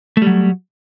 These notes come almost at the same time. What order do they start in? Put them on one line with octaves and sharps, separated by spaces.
A3 G3 F#3